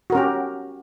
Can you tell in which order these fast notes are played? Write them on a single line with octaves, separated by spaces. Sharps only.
F#4 A#4 C#4 G4